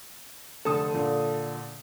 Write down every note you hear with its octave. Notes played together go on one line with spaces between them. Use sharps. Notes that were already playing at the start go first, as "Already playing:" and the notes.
F1 D3 A4 D#6
A#2 D3